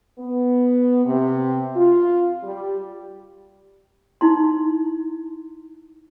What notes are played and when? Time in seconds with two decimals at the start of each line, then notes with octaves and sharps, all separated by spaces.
0.19 B3
1.05 C3
1.76 F4
2.43 G3
4.21 D#4 E4 C6